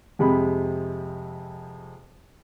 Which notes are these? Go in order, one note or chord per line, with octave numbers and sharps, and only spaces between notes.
F2 C3 G#3 B5